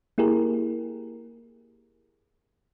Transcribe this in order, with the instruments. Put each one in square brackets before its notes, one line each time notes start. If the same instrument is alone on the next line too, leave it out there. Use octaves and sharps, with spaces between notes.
[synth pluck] A#3 E4 G4 G#4 A#4